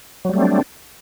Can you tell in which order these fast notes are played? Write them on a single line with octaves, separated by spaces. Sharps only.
F#3 G3 A3 C4 D4